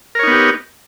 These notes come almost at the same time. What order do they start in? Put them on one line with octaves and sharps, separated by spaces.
A#4 C#5 D#4 B3 G4